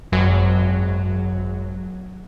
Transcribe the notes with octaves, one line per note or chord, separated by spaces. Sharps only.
G#1 F#2 F#3